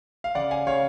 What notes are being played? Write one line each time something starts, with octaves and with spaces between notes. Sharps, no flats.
F5
C#3 D5 F#5
F5 G#5
C#3 C#5 F5